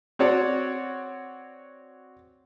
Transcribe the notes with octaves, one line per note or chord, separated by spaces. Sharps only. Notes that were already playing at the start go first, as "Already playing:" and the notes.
C4 F#4 C#5 D5 F#5